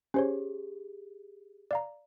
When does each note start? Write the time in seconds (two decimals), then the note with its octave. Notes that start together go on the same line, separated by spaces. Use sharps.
0.14 C#4 G4 G#4 C5 C#5
1.71 D5 F5 A#5